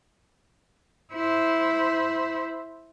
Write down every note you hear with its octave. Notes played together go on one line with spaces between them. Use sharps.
E4 C5